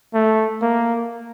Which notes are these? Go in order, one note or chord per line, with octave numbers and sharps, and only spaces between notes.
A3
A#3